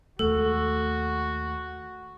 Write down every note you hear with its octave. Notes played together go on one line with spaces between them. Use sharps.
D#2 G#3 A3 F#4 A4